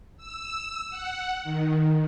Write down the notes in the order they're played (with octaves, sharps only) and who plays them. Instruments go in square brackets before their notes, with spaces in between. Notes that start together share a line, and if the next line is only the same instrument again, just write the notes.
[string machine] E6
F#5
D#3